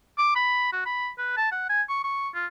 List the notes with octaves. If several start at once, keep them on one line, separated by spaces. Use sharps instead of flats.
D6
B5
F#4
B5
B4
A5
F#5
G#5
C#6
C#6
F4